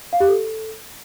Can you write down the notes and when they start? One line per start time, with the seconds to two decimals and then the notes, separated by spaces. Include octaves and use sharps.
0.13 F5
0.20 G4
0.28 A4